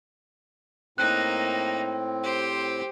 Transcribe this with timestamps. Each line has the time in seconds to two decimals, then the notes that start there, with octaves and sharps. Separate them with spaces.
0.98 A2 A#3 C4 D#4 F#6
2.23 G4 C5